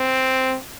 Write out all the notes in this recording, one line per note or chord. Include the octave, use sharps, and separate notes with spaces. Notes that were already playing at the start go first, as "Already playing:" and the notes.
Already playing: C4